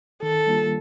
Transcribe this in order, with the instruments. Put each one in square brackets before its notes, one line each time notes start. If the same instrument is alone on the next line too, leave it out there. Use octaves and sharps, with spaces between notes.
[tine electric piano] D#3 [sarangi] A4
[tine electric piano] G3 A#3 D4 F4